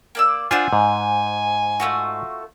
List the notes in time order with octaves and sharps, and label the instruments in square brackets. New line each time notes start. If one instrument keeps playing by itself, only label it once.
[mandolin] A#3 D5 E6
[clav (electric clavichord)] D4 F4 [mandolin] C5 F#5 E6 [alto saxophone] G#5
[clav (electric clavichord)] G#2
[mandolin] A3 F4 F#4